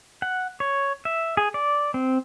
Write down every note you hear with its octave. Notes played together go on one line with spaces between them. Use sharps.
F#5
C#5
E5
G#4
D5
C4